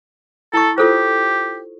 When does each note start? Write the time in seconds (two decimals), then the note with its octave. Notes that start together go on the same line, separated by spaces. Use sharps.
0.54 E4 A4 C#6
0.78 F4 G4 A4 C5